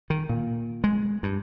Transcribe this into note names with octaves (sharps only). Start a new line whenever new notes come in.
D#3
A#2
G#3
G2